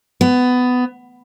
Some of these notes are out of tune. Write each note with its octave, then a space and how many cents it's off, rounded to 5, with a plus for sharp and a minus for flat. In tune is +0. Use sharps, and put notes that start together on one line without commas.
B3 +15